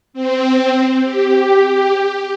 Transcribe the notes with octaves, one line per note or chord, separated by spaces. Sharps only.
C4
G4